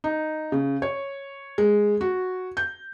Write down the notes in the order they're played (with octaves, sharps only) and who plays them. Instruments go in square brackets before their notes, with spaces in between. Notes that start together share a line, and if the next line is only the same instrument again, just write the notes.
[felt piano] D#4
C#3
C#5
G#3
F#4
G6